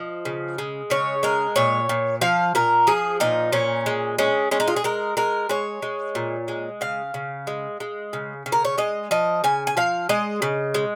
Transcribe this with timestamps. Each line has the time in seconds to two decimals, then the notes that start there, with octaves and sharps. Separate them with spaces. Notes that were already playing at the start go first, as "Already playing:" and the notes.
Already playing: F3 D#5
0.25 C#3
0.58 G#3
0.90 C#3 C#5
1.23 G#3 A#4
1.56 A#2 C#5
1.89 A#2
2.21 F3 F5
2.55 A#2 A#4
2.87 F3 G#4
3.20 A#2 D#4
3.52 A#2 C#4
3.86 G#3
4.18 G#3 C#4
4.51 G#3 C#4
4.60 D#4
4.68 F4
4.76 G#4
4.84 G#3 A#4
5.17 G#3 A#4
5.49 G#3 C#5
5.82 G#3
6.15 A#2
6.48 G#3
6.81 C#3 F5
7.14 C#3
7.47 G#3
7.80 G#3
8.13 C#3
8.46 C#3
8.52 A#4
8.65 C#5
8.78 G#3 D#5
9.11 F3 D#5
9.44 C#3 G#5
9.67 G#5
9.77 F3 F5
10.09 G#3 D#5
10.42 C#3
10.74 G#3